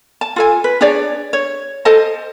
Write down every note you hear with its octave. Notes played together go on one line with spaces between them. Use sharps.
A5
F4 A4 G#5
B4
D4 G#4 C#5 D5
C#5
A4 C5 D#5 A5